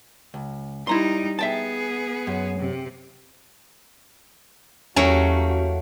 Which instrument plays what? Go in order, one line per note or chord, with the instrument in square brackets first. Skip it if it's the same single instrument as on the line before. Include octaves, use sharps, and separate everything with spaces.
[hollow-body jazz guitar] C#2
[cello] G3 D#4 [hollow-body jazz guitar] E4 A#5 C6
[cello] B3 G#4 [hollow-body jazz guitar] E5 G5 A5
[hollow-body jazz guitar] F#2
[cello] C3
[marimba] E2 [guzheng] F#3 A3 A#3 [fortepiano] C#4 [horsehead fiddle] F#4 G4